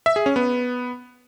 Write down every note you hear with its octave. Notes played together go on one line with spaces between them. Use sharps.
E5
G#4
C#4
B3